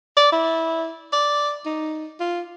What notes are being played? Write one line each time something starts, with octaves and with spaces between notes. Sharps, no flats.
D5
E4
D5
D#4
F4